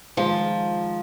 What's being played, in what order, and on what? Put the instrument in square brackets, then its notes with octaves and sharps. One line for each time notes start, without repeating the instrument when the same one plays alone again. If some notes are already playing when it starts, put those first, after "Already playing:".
[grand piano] D#3 G#3 F4 [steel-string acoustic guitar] F3